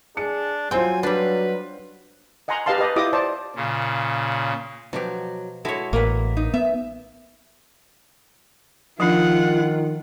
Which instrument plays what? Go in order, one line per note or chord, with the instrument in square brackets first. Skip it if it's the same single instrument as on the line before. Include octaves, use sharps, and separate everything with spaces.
[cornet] D4 [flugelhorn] G#4 [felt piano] C#7
[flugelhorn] F#3 [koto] C4 G5 [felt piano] F4 C5 C6 [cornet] G#5
[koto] G3 D4 [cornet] B4
[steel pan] D#5 F#5 G#5 A#5 C6
G4 B4 D#5 F5 A5 C6
G4 B4 D#5 A5
E4 F4 G4 D#5 D6 D#6
C5 D5 A5
[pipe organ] A#2 C#3
[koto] B2 F3 G4 [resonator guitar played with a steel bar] F#3
[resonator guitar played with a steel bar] G#3 F#4 A4 [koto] E4 C#5
[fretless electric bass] A1 [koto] A#3 E4 B4
[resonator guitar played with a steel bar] D#4
[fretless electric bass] B3 [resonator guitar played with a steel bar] E5
[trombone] D#3 [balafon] F3 D4 [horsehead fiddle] F4 [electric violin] F#5